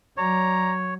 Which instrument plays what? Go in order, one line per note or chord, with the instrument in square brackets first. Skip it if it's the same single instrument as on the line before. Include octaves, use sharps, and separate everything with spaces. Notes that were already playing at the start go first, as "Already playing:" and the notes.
[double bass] F#3 [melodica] C#5 [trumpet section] D5 A#5